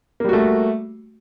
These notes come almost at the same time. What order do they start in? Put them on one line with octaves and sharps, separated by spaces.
A#3 G3 F#4 A3